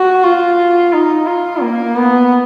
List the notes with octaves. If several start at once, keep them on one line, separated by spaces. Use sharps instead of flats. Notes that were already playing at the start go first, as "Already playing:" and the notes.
Already playing: F#4
F4
D#4
F4
A#3
B3